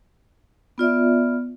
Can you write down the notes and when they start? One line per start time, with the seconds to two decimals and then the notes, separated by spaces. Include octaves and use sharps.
0.78 B3 F4 D5 E5